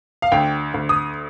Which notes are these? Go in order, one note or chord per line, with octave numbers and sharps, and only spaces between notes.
F5
D2 G5
D2
D#6